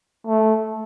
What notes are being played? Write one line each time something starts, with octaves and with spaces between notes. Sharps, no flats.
A3